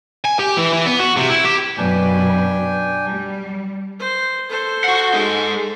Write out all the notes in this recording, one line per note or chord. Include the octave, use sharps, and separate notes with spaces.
G#5
G4
E3
E3
B3
F#4
C3
E4
G4
F#2 B2 D4 B4 G5 G#5
G3
C5
A4 C5
F#4 F#5
G#3 D#4